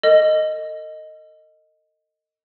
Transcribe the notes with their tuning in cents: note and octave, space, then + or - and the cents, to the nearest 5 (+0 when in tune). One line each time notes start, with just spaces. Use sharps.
A4 +45 D#5 +0